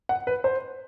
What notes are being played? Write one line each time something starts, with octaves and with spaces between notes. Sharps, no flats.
F#5
B4
C5